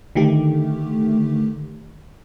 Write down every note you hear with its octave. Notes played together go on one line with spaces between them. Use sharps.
D3 D#3 A3 G4